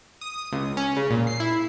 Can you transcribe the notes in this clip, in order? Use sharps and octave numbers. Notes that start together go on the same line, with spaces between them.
D#6
C#2
C#4
C#3
A#2
C7
E4